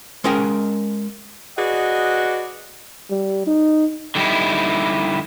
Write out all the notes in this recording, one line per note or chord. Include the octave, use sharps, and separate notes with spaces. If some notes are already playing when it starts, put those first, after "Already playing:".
G#3 C#4 A#4 D#5 G5
F#4 G#4 B4 D5 D#5 F#5
G3
D#4
D3 F#3 G3 D#4 E4